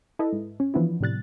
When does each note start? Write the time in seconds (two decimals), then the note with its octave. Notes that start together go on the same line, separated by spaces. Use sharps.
0.19 E4 A4 B4 D#5
0.32 G#2
0.60 C#4
0.74 E3 F3 B3 D4 E4
1.01 A2 C3 G3 F#6 A6